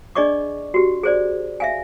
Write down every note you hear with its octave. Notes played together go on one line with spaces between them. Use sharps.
D4 G#4 D5 D#5 C#6 D6
F#4 G4
G#4 C5 D5
E5 F5 G#5